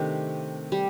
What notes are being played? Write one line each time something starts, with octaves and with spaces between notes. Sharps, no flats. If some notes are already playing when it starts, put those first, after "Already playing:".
Already playing: C3 D#3 A3 D4
G3